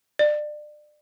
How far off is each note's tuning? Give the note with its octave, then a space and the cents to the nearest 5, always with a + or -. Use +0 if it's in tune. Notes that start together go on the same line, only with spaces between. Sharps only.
D5 +30